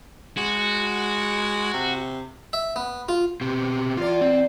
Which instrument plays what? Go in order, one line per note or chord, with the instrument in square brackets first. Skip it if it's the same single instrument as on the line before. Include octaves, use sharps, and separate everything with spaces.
[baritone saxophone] G#3 [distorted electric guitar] F#4
[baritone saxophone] C3
[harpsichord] E5
B3
F4
[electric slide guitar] B2 C4 G4
[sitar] E2 D5 [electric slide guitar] F4
[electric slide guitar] C4